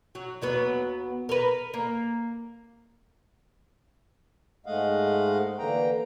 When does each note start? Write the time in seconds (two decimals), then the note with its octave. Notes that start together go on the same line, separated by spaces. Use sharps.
0.15 F#3
0.41 D#2 F#3 B3
1.29 A#4 B4
1.74 A#3
4.66 G#2 G#3 A3 D#5 F5 F#5
5.58 D3 E3 A#3 G5 A#5